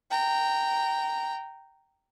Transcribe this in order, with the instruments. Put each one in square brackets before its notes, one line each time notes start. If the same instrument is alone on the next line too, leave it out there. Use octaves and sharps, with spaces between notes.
[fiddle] G5 A#5